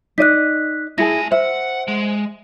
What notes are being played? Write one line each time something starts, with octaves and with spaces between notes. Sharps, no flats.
D#4 D5 D#5 F#6 B6
A3 E4 G#4 G#5 A5 A#6
C5 E5 F#5
G#3